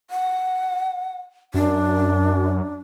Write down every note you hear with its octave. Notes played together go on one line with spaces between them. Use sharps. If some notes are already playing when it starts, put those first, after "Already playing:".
F#5
F#2 D4